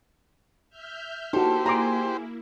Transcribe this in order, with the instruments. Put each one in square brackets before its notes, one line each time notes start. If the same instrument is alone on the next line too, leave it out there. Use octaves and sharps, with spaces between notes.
[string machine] E5 F6 G6
[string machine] A#3 E4 [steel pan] D#4 F#4 [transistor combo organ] G4 C5 [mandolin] A4
[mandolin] G#4 [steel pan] A#5 C6 D6